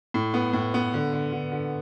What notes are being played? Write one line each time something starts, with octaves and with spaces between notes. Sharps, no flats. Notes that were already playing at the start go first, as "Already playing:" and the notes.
A2
B3
A2
B3
D3
D3
D3
D3